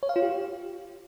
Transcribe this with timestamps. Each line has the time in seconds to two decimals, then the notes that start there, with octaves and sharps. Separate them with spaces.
0.03 C#5
0.09 F5
0.16 F4
0.22 G4